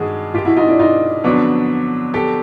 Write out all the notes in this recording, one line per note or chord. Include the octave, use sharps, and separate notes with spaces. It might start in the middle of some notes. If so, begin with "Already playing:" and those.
Already playing: G2 D#3 G#3 F#4 G#4
F4 G4
E4 F#4
D#4 F4
D4 E4
D#4 F4
F2 D3 F#3 B3 D4
G4 A4